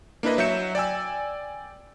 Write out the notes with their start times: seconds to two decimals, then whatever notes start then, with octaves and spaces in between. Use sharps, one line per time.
0.23 A#3 D4 E4 B4 D#5
0.38 F#3 E5 G6 C#7 E7
0.75 D5 G5 G#5 E6